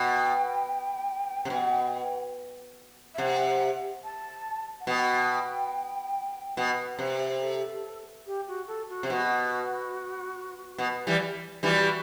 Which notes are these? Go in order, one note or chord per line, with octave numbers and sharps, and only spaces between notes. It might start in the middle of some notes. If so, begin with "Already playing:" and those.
Already playing: B2 G5
C3
B2
E5
C3 F#5
A5
F#5
B2 G5
B2
C3
A4
G4
F#4
A4
F#4
C3
B2 F#4
B2
E3 G3
E3 G3 F#4